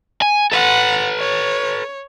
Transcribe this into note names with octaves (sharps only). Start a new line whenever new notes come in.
G#5
A4 B4 F#5
C#5